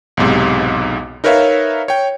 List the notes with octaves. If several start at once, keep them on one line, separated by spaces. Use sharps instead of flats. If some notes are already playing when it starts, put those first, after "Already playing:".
B1 E2 G#2 C3
D#4 A#4 B4 C#5 E5 F5
C#5 G5